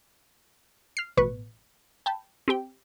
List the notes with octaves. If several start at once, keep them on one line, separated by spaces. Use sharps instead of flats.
F6 C7
A1 B2 B4 C#6
G5 A5 B5
C4 G4 G5